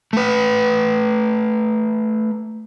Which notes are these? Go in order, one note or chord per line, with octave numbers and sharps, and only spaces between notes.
A3 B4